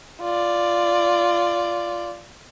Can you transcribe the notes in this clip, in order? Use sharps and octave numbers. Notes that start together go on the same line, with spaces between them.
F4 D5